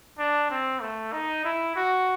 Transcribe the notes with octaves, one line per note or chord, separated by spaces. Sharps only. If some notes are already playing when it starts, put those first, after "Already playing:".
D4
C4
A3
D#4
E4
F#4